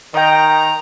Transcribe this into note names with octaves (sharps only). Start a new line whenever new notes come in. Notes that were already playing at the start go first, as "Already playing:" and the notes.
D#3 D#5 G5 A#5